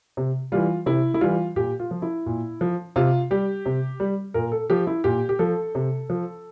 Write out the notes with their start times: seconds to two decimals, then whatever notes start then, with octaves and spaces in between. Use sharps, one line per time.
0.17 C3
0.52 E3 G3 F4
0.86 C3 E4
1.14 E4
1.21 E3 G3 F4
1.56 A#2 G4
1.80 F4
1.91 F3
2.02 E4
2.26 A#2
2.61 F3
2.96 C3 F4
3.31 G3 G4
3.66 C3
4.00 G3
4.34 A#2 A#4
4.52 A4
4.70 F3 G4
4.87 E4
5.04 A#2 G4
5.29 G4
5.39 F3 A4
5.75 C3
6.10 F3